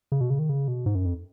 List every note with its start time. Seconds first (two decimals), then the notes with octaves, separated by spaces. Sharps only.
0.12 C#3
0.21 B2
0.30 C#3
0.39 D#3
0.49 C#3
0.68 B2
0.86 G#2
0.95 F#2
1.05 F2